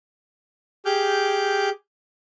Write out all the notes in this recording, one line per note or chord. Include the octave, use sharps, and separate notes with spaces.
G4 G#4 D6 F6 G6